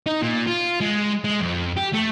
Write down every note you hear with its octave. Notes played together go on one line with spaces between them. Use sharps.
D#4
A#2
F4
G#3
G#3
F2
G4
A3